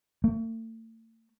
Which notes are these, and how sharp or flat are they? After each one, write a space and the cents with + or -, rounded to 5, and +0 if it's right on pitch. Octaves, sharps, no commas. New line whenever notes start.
A3 +40